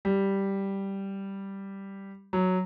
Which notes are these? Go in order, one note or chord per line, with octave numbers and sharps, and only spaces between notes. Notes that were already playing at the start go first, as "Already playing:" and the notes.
G3
F#3